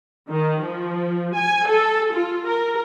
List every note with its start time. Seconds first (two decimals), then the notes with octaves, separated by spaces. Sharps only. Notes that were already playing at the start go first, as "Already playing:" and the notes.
0.29 D#3
0.61 F3
1.35 G#5
1.67 A4
2.12 F4
2.45 A#4